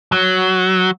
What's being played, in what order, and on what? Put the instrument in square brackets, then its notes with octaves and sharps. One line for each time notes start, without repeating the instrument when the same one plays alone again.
[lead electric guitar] F#3